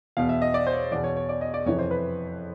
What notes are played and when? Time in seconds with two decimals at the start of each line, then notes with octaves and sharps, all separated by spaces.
0.17 E2 B2 F5
0.29 E5
0.42 D#5
0.54 D5
0.67 C5
0.73 C#5
0.92 E2 B2 D5
1.04 C#5
1.17 C#5
1.29 D5
1.41 D#5
1.54 D5
1.66 F2 C3 E3 C#5
1.79 C5
1.91 B4